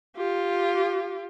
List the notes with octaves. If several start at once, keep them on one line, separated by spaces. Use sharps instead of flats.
F4 G4